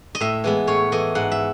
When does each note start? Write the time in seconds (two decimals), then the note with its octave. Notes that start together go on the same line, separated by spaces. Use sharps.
0.15 D#5
0.20 A2 E5
0.44 E3 G#3 B3
0.67 A2 C#5
0.92 E3 A3 D#5
1.15 G#2 F#5
1.32 E5